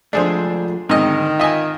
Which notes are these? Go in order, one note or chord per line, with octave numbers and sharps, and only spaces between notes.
F3 G#3 A3 D4 G#4 C5
D2 G#2 D#3 C4 D#5
F4 D#5 E5 G#5